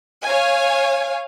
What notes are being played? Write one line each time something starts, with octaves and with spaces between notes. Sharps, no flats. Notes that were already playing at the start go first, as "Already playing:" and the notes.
C#5 F5 G#5